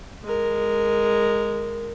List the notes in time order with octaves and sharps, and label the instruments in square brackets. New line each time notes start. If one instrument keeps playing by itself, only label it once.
[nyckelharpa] G#3 A#4